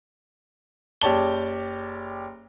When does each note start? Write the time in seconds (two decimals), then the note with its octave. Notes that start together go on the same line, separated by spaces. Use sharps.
1.02 F#1 G4 C#5 D5 A5 G7